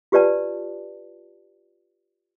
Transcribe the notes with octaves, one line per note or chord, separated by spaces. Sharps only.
F4 G4 B4 D5 A5